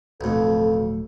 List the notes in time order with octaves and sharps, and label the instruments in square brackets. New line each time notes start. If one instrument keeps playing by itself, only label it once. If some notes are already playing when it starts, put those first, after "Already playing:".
[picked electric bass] D1 A3 [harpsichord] B1 F2 [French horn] A4